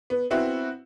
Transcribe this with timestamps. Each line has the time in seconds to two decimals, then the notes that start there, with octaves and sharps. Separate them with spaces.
0.10 B3
0.30 B3 C4 E4 F#4